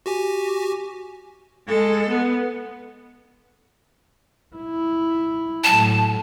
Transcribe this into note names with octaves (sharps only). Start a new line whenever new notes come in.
F#4 G4 G#5
G#3 A4
B3
E4
A2 F#3 A5